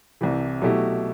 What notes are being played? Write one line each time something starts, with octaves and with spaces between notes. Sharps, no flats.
C2 C3 E3
B2 F#3 A3 E4 G4